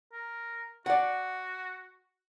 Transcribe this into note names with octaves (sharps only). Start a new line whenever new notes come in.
A#4
F#4 D5 F#5